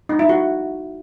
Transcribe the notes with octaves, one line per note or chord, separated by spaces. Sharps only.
D#4
E4
F#4